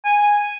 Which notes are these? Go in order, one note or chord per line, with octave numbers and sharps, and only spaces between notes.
G#5